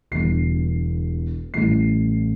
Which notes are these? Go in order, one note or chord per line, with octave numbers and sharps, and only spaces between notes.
E1 E2 D3 G3 C7
A1 A2 E3 G3 C7